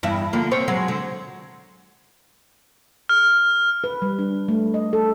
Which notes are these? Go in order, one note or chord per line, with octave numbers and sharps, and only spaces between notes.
E2 G2 E4
D3 F3 A#3
G3 C4 C#5
F#3 G#3
D3
F6
B4
G3
D4
A3
D#5
A4